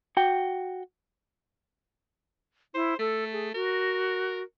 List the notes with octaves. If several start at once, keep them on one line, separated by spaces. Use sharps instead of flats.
F#4 G5
E4 C5
A3 A4
G#4
F#4 A#4